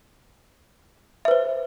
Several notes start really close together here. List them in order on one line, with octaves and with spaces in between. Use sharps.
E5 B4 C5